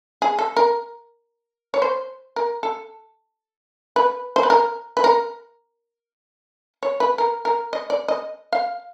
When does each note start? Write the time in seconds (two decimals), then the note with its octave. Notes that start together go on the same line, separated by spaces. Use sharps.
0.22 G#4
0.39 A4
0.57 A#4
1.74 C#5
1.82 C5
2.36 A#4
2.63 A4
3.96 B4
4.36 C5
4.43 B4
4.50 A#4
4.97 B4
5.04 A#4
6.83 C#5
7.00 B4
7.18 A#4
7.45 A#4
7.73 D#5
7.90 D5
8.08 D#5
8.53 F5